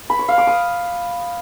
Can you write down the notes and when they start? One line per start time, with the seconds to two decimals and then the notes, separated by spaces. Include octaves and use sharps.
0.10 B5
0.19 C#5
0.28 F5
0.38 D6
0.47 D#6